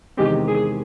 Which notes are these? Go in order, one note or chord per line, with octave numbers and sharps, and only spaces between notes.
E2 C3 D#3 G#3 C4 G4
G#4